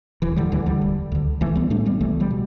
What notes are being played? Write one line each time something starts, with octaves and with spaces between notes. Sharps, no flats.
E1 E3
D3 G3
D2 D3 E3
D3 G3
E1
D2 D3
B1 E3 A3
G3 B3
A2 A3 D4
G3 B3
B1 E3 A3
D3 G3
B2